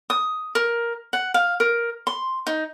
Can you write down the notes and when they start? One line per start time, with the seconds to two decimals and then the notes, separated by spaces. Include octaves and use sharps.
0.10 D#6
0.55 A#4
1.13 F#5
1.34 F5
1.60 A#4
2.07 C6
2.47 D#4